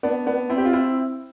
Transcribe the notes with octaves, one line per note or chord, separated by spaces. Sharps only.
B3 D4
B3 D4
C4 E4
G4
F4
C4 E4